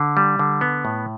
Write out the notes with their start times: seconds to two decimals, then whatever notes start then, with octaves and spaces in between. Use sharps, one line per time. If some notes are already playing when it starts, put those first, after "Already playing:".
Already playing: D3
0.17 G3
0.39 D3
0.61 B3
0.85 A2